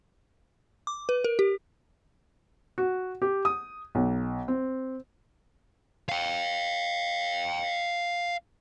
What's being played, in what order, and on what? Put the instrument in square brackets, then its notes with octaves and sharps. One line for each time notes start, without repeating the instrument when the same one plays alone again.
[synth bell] D6
B4
A#4
G4
[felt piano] F#4
G4
D#6
B1
C4
[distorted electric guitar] F5 G5